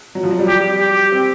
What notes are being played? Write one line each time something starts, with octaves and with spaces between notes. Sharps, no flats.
F#3
F3
F#3
G3
G4
G4
C4